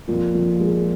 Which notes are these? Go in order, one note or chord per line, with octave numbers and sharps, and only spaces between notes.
F2 A#2
F2
G#3